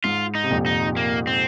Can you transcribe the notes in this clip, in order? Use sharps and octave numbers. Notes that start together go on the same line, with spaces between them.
G#2 F4
D#4
C3
F2 A#2
D#4
A#3
C4